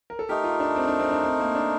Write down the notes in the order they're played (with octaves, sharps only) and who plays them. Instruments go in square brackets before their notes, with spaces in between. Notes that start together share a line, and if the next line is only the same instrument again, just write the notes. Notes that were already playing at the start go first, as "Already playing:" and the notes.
[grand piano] A#4
A4
[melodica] A3 D#4 A#4 [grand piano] G4
[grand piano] F4
D4
C4
D4
C4
D4
C4
A#3
D4